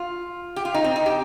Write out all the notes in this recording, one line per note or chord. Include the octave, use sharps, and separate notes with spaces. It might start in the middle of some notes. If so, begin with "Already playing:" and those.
Already playing: F4
G4
F4
D#4
C4
D#4
G4